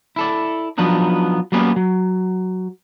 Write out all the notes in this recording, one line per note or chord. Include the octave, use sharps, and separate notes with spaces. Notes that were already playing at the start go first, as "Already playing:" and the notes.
E4 A4 D5
F3 F#3 B3 D4 D#4
F#3 G3 A#3 B3 C#4
F#3